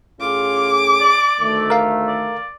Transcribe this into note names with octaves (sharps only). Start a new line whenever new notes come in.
A2 C#4 F4 G#4 D6
D5
D2 D#3 A3
A#4 F5
D5